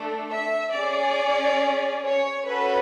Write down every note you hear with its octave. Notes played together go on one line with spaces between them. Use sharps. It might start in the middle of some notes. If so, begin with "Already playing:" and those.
Already playing: A3 D4 A4
E5
C#4 G#4 D5
C#5
C#4 F#4 A4 B4